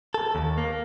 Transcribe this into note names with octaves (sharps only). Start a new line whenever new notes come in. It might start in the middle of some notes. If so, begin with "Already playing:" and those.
A4
D#2
A#3